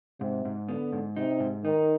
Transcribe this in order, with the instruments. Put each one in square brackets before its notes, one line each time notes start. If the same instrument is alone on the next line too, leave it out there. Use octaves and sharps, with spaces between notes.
[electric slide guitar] G#2 [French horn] C3
[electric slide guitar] G#2
[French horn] D3 [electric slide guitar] B3
[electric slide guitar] G#2
[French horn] C3 [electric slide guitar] D#4
[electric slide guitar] G#2
[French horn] D#3 [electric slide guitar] D#4